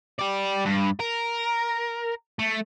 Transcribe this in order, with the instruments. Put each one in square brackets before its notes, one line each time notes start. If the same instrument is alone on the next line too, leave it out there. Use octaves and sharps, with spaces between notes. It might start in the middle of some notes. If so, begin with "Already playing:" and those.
[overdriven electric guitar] G4 D5
G2
A#4
A3